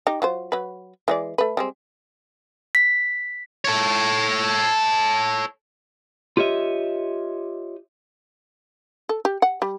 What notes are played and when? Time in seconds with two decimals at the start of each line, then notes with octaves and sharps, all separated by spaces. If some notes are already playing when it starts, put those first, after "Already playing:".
0.07 D#4 G4
0.22 F#3 F4 C5
0.52 F#3 B4
1.08 E3 G#3 D5
1.38 A3 B4
1.57 G3 G#3 C4
2.75 B6
3.65 A4 C#5
6.37 F4 G4 C#5 D#5 E5
9.09 A4
9.25 G4
9.42 F#5
9.62 G3